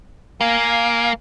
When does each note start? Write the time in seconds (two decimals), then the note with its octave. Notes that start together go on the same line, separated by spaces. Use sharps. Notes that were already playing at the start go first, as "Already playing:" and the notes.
0.41 A#3 F5 G#5